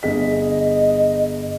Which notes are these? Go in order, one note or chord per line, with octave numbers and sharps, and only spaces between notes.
G1 G#4 D#5 B6